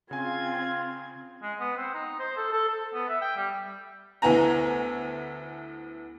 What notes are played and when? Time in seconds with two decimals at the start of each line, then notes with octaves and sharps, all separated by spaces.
0.11 C#3 C4 F4 G#5 G#6
1.42 G#3
1.60 B3
1.77 C4
1.94 D#4
2.20 C5
2.37 A4
2.53 A4
2.69 A4
2.94 B3
3.09 E5
3.22 G5
3.37 G3
4.22 D2 B3 E4 G#5 A#5